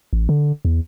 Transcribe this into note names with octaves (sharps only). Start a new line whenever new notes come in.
A1
D3
E2